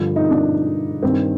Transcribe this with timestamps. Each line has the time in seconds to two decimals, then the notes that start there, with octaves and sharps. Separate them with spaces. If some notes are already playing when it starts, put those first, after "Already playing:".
Already playing: G2 D3 F3
0.16 D#4
0.30 D4
1.03 G2 D#3 C4